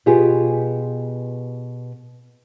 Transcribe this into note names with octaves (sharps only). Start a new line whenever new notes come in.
B2 B3 F4 G4 G#4